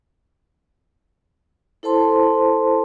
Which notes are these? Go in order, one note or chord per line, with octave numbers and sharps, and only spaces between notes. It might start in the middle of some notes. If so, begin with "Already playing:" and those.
E4 A4 C5 A5 C6